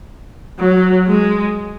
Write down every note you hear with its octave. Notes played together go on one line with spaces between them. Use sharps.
F#3
G#3